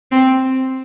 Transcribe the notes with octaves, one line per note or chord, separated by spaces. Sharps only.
C4